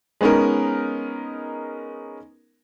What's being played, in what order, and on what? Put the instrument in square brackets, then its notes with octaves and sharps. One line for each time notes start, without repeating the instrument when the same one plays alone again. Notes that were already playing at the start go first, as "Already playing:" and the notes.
[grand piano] G#3 B3 C#4 D#4 A#4